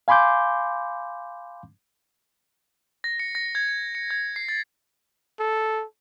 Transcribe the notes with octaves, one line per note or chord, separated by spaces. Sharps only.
F5 G#5 B5 C6 D6 G6
A#6
C#7
A#6
G#6
C#7
C#7
G#6
C7
A6
A4